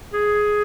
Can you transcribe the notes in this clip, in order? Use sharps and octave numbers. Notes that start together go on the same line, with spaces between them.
G#4